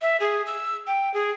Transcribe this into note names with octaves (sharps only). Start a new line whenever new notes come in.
E5
G#4
E6
G5
G#4